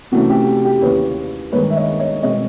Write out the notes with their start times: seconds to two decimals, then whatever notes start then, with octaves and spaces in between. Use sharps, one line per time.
0.12 C3 E3 A3 C#4 F#4
0.29 G4
0.65 G4
0.82 D#2 C#3 E3 B4 C#5
1.52 G2 D#3 G#3 B4 C#5
1.70 E5
1.76 C#5 D#5
1.99 C#5 D#5
2.23 B2 G#3 C4 C#5 D#5